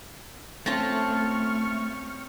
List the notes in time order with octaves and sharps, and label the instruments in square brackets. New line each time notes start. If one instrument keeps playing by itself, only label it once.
[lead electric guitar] A3 [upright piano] C4 C#4 A#6 [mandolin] F4 A5 [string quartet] C#6 F6